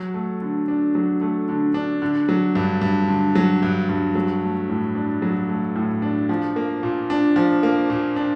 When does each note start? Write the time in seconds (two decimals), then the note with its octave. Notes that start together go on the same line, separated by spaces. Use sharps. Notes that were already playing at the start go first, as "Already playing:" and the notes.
Already playing: F#3
0.14 A3
0.42 D3
0.68 D4
0.95 F#3
1.21 A3
1.49 D3
1.74 D4
2.02 D3
2.29 F#3
2.55 G2
2.82 G2
3.08 D3
3.35 F#3
3.63 G2
3.89 G2
4.15 F#3
4.42 A3
4.69 A2
4.95 D4
5.22 F#3
5.49 A3
5.75 A2
6.02 D4
6.29 F3
6.56 A#3
6.83 A#2
7.10 D4
7.36 F3
7.63 A#3
7.90 A#2
8.16 D4